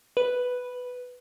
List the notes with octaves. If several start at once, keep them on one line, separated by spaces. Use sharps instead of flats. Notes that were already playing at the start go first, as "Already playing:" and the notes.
B4